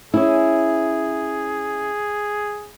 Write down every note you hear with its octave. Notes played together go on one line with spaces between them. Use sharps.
C#4 E4 G#4